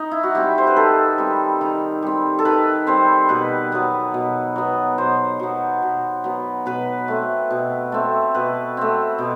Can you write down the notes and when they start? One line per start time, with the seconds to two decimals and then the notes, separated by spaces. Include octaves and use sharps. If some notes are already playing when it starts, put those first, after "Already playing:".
Already playing: D#4
0.11 E4
0.23 F#4
0.35 G3 C4 G4
0.58 C5
0.67 B4
0.76 D#3 A4
1.18 G3 C4
1.61 D#3
2.02 G3 C4
2.39 A4
2.45 D#3 B4
2.87 G3 C4 C5
3.29 B2 B4
3.72 F#3 B3
4.14 B2
4.56 F#3 B3
4.98 B2 C5
5.40 F#3 B3
5.82 B2
6.24 F#3 B3
6.66 B2 B4
7.08 A3 C4
7.50 B2
7.92 A3 C4
8.34 B2 B4
8.77 A3 C4
9.18 B2